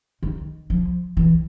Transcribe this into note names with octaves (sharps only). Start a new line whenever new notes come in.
D#3
F3
E3